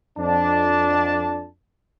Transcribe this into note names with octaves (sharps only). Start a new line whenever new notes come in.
F2 D4 A5